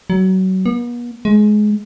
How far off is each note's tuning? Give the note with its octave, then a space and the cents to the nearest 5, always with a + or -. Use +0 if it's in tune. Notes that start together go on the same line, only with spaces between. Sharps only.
F#3 +25
B3 -45
G#3 +20